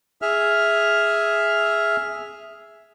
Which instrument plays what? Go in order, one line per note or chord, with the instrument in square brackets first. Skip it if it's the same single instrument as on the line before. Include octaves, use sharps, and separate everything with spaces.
[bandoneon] G#4 E5 F6